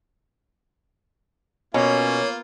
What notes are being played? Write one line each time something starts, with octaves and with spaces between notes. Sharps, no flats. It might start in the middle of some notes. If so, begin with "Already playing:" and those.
B2 A#3 C#4 F4 C#5